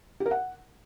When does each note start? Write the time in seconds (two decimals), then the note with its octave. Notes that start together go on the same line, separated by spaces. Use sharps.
0.20 G4
0.26 A#4
0.31 F#5